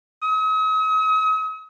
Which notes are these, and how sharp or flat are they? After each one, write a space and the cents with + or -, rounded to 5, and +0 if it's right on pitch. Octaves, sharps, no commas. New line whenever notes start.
D#6 +45